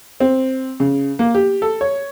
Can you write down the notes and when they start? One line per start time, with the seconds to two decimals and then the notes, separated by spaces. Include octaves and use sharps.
0.20 C4
0.80 C#3
1.19 A#3
1.35 G4
1.62 A4
1.81 C#5